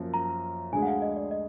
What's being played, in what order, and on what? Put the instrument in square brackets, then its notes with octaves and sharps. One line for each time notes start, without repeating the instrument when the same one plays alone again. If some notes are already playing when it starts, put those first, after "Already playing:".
Already playing: [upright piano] F#2 F3 A#3
[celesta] A#5
[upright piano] D2 D3 G#3 D4 G#4 [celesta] G#5
[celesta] F#5
F5
D#5
D5
D#5